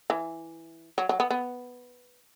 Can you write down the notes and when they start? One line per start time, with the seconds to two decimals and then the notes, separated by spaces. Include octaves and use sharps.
0.10 E3
0.98 F#3
1.09 F#3
1.20 B3
1.30 B3